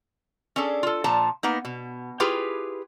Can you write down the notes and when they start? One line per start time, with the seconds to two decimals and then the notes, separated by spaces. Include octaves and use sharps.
0.56 C#4 D4 G#4 A4
0.83 F4 A4
1.04 A#2 F3 A5 A#5
1.43 A#3 B3 D#4
1.65 B2
2.20 E4 F4 G4 G#4 B4